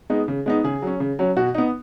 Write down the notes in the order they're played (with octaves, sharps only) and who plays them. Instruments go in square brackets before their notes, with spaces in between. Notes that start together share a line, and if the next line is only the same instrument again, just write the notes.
[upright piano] G#3 B3 D#4
C#3
G#3 B3 D#4
C#3 G#4
F#3 C#4
C#3
F#3 C#4
B2 F#4
B3 D#4